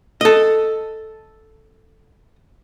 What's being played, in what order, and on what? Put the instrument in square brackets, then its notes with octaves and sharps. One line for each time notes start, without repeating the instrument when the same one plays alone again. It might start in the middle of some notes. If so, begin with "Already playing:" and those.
[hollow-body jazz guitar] A4 D#5